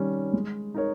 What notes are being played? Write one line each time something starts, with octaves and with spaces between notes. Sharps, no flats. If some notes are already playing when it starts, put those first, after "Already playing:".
Already playing: D#3 G3 C#4
G#3
D#4 A#4 C#5